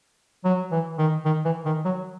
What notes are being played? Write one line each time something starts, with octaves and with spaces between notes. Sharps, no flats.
F#3
E3
D#3
D#3
E3
D#3
F#3